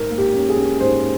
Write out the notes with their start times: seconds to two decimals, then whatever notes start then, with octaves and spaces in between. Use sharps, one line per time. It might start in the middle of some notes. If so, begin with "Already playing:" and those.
Already playing: G#2 A#4
0.10 A#3
0.18 G4
0.34 C#4
0.49 G#4
0.57 C#4
0.80 G#2 C5